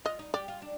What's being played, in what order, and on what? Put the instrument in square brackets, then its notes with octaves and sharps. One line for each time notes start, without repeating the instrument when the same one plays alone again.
[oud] F4 [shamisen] D#5
[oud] D#4
[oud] G4 [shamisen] D5
[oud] F4
D4